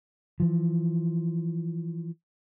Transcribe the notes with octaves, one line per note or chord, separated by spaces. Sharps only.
E3 F3